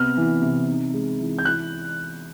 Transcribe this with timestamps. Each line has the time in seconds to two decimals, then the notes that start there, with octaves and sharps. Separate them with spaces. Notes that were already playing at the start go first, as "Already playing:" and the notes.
Already playing: C3 B3 F6
0.17 E3
0.42 C3
0.68 D#4
0.94 G#3
1.20 E3
1.39 G6
1.45 E4 F#6